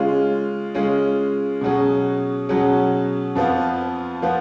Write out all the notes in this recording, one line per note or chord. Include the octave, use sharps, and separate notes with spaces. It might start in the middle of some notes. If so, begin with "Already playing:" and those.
Already playing: C#3 G#3 C#4 F4 G#4
C#3 G#3 C#4 F4 G#4
B2 F#3 C#4 G#4
B2 F#3 C#4 G#4
F2 F3 B3 F4
F3 B3 F4